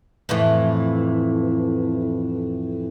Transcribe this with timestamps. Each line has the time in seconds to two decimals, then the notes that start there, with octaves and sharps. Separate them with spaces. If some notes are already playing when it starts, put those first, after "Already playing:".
0.29 F2 A2 E3